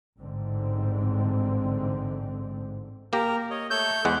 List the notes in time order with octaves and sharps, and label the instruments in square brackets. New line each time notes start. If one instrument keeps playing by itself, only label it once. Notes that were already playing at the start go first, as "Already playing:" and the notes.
[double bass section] A1 G#2 D3 C4
[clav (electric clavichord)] A#3 G4 [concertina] A#4 A#5
[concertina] C#5 D#5
[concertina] A3 C#5 E6 [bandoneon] G6
[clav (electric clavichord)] E2 G#3 F#5 [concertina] C5 B5